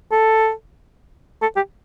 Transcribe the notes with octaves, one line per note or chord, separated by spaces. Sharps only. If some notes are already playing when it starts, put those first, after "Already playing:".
A4
A4
G4